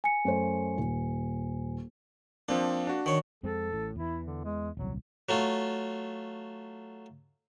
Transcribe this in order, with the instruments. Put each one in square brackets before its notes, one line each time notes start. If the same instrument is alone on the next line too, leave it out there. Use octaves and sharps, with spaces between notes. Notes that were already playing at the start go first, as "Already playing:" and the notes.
[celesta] G#5 C#7
[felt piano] F#2 A3 C5
D#1
[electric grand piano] F3 C4 D4 [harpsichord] A#3
[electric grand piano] D4 F#4
[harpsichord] D#3 C#5
[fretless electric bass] F2 G#3 C4 [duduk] A4
[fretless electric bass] A1 A2
[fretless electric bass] E2 E3 [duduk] E4
[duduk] D3
G#3
[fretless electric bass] D#1 C2 [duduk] F#3
[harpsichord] F#3 A3 F4